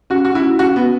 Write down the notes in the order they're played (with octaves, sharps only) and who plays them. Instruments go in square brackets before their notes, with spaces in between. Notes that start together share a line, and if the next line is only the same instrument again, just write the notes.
[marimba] C#4 [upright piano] F#4
[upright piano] F#4
[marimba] C#4 [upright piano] E4
[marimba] C#4 [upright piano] F#4
[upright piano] B3
[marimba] C#4